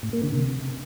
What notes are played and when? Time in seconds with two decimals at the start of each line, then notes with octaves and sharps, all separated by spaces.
0.03 A2
0.13 A#3
0.23 D3
0.33 C3